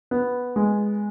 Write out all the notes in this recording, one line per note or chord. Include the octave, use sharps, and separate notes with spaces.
B3
G#3